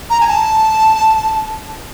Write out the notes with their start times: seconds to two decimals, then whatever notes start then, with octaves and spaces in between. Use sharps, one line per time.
0.10 A#5
0.21 G#5
0.27 A5